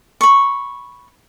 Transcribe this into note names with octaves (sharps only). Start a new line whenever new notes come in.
B5 C#6